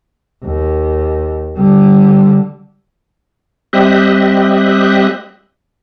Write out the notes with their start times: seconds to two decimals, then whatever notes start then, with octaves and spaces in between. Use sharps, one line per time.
0.44 D#2
1.56 D3 G3
3.73 G3 C4 G4 D#5 E5 F#6